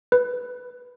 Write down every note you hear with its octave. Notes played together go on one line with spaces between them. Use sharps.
B4